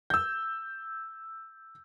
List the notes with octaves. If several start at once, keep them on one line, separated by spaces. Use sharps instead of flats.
E6 G6